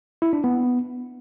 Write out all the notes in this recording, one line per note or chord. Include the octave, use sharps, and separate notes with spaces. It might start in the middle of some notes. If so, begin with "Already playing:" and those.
E4
D4
B3